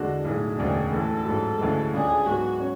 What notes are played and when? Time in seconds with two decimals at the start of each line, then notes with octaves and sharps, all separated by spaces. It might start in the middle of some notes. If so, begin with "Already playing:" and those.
Already playing: E2 D3 G#3 D4 F#4
0.24 B1 A2 G#3 G#4
0.58 E1 D2 C#3 G#3 D4
0.92 A1 A2 E3 A4
1.25 A1 G#2 F#3
1.59 D2 C#3 E3 G#3
1.93 C#2 C#3 G#3 D4 G#4
2.26 G#2 F#3 B3 F#4
2.60 C#4